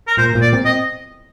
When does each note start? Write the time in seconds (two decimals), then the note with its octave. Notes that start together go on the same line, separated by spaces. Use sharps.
0.07 A#4
0.17 A#2 C5
0.35 A#2
0.41 D5
0.53 C4
0.65 D#5